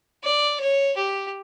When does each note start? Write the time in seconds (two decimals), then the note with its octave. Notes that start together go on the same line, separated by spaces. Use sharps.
0.23 D5
0.60 C#5
0.97 G4